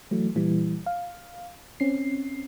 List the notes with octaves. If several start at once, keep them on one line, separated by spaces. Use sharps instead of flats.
E3 F#3 A3
A#2 E3 G3
F5
C4 C#4 C7